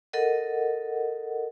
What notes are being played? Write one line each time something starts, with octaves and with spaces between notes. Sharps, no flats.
A4 A#4 D#5 F#5